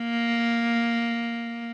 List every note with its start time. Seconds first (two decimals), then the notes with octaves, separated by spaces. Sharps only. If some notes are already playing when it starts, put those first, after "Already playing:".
Already playing: A#3